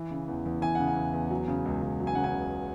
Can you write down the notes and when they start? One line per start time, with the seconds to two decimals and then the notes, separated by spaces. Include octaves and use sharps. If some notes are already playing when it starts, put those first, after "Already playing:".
Already playing: E3
0.11 C#3
0.28 E2
0.46 E2
0.62 E3 G#5
0.75 C#3 F#5
0.87 G#5
0.97 E2
1.14 E2
1.31 F#3
1.48 C#3
1.65 C#2
1.82 C#2
2.00 F#3
2.07 G#5
2.15 C#3 F#5
2.24 G#5
2.33 C#2